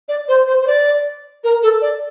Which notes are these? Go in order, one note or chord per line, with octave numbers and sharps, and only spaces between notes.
D5
C5
C5
C5
D5
A#4
A4
D5